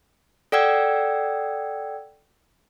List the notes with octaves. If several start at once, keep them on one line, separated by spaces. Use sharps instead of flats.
A4 D5 F#5 G5 E6 G#6